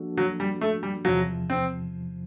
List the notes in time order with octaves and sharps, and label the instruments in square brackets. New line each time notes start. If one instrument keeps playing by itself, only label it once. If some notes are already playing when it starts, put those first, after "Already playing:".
Already playing: [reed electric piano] F3 A#3 D4 F#4 A4
[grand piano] F#3
G3
A3
G3
[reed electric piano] E2 C3 F3 [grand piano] F#3
[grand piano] C4